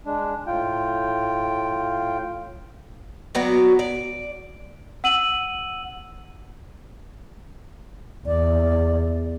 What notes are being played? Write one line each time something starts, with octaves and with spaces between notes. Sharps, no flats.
G#3 D4
A2 F4 G5
F#3 B3 F#4 D5
D5
F#5 E6 D#7 F#7
E2 D5